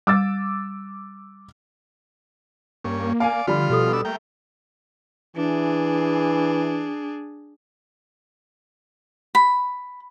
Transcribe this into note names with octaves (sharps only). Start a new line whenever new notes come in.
G3 D6 E6 A6
G2 A#3 C#4
D5 F5 G#5
D3 F3 G3 F4 B5
B2 G4 A4 D#6
B3 D4 E6
A3 A#3 G5
E3 D4 G#4
B5